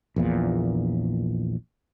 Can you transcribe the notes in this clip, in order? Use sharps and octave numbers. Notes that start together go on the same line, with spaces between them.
A#1 E2 A#2